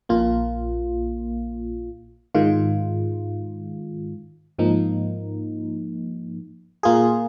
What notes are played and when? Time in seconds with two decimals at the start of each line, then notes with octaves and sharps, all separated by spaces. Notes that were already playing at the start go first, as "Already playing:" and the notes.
0.09 A#1 A#2 A#3 F4
2.34 G#2 D#3 G#3 F4
4.59 G#2 F3 A#3 D#4
6.83 A#2 A#3 F4 G#4